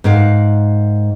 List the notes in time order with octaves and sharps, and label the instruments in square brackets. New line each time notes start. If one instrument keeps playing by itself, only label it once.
[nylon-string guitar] G#2 A#4 F5 F#5